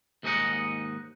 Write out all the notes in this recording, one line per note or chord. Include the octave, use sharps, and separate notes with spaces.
D#2 G#2 D#4 G#4 D#5 F#5